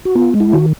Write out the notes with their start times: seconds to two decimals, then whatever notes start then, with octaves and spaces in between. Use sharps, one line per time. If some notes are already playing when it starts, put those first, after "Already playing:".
0.05 F#4
0.15 B3 F4
0.34 G#3
0.40 E4
0.53 D#3 F#4